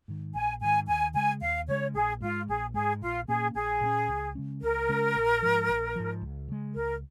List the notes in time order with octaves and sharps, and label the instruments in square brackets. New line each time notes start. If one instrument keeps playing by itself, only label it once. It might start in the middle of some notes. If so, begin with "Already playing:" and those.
[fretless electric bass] G#2 D#3
[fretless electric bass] A#1 [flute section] G#5
[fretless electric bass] G#2 D#3 [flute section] G#5
[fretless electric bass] D#2 [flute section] G#5
[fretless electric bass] C#3 G#3 [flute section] G#5
[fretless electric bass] D#2 [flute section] F5
[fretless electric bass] C#3 G#3 [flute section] C#5
[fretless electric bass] A#1 [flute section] G#4
[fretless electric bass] G#2 G#3 [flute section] F4
[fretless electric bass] A#1 [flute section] G#4
[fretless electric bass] G#2 G#3 [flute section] G#4
[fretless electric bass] A#1 [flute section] F4
[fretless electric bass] A#2 A#3 C#4 [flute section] G#4
[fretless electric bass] A#1 [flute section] G#4
[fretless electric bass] A#2 A#3 C#4
C#2
C#3 G#3 C#4
[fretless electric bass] C#2 [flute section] A#4
[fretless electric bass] C#3 G#3 C#4
A#1
G#2 F3
A#1
G#2 F3
C#2
C#3 G#3
[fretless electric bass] C#2 [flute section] A#4